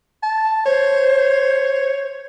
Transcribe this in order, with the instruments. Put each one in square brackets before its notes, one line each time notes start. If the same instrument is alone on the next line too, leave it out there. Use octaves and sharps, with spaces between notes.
[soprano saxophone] A5
[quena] C5 [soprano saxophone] C#5